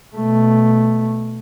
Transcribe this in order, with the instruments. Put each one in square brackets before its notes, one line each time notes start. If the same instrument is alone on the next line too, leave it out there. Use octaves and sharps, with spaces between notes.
[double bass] B2 A3